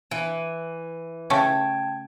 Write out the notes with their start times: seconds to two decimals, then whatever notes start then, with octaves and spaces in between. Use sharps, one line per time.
0.11 E3
1.30 C#3 A3 C#4 G5 A5 G#6